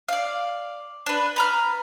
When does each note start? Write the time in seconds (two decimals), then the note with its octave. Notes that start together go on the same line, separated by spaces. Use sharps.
0.09 D5 F5
1.06 D4 B4
1.36 B4 A#5 F6